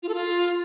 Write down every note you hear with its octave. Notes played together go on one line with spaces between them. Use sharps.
F4
A4
F4